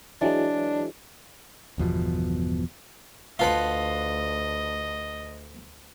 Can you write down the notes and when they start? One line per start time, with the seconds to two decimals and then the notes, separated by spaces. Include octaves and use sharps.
0.21 E3 F#3 G#3 D4
1.78 G1 E2 B2 F3
3.39 D2 F4 B4 D#5 F5 F#5 A5